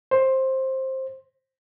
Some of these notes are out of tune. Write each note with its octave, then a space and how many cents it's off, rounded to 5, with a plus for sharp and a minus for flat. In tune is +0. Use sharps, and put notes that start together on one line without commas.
C5 +15